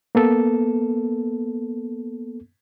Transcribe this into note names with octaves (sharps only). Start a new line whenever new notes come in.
A#3 B3 A4